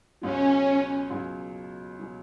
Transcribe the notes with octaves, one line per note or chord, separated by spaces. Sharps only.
C#2 B2 F#3 C#4
C#2 B2 F#3
B2 F#3